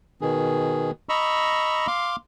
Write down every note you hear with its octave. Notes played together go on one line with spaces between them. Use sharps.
B2 D#3 G#4
D#5 A#5 B5 C#6 E6
F5 C6 D6